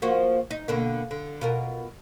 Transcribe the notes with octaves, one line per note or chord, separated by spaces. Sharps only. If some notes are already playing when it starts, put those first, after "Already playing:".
F3 A#3 F#4
D#4
B2 D3 A#3
D3
B2 F4 A#4